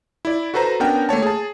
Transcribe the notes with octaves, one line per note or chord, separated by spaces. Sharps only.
E4 D5
F#4 A4 B4 C5 A#5
B3 C#4 D4 A#4 F#5 G5
A3 A#3 C#5 A5
G#4 A5